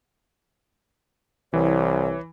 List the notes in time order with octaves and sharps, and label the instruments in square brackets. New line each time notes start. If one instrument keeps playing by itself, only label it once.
[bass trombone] C2 [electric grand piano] E3 [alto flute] C#5